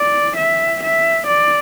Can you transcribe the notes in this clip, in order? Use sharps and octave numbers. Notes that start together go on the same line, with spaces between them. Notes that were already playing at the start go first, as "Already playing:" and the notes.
Already playing: D5
E5
E5
D5